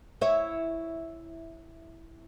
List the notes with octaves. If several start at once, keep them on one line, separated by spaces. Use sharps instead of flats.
E4 C#5 E5